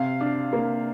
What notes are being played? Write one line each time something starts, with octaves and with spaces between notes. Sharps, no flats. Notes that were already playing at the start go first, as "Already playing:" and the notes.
Already playing: C3 F5
D4
A#3